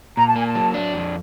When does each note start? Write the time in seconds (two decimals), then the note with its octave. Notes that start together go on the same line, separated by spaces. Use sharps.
0.17 A#2 A#5
0.27 A5
0.36 A#3 G#5
0.46 A5
0.55 F#3
0.74 D4
0.94 F2